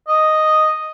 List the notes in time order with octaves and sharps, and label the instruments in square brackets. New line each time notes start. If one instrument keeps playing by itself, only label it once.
[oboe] D#5